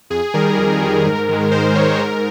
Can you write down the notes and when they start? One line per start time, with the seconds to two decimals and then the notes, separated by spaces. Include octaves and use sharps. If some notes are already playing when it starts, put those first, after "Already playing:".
0.10 F2 G#4
0.34 D#3 G3 A#4
0.57 F2
0.82 D#3 G3
1.06 G#2
1.29 D#3 G#3
1.51 G#2 C5
1.75 D#3 G#3 C#5
1.99 G#2 A#4